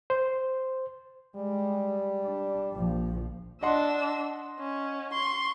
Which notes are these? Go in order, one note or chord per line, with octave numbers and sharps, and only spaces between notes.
C5
G3 G#3
D4
A#1 F3
D4 D#5 F#5 C6 E6
C#4
C6 C#6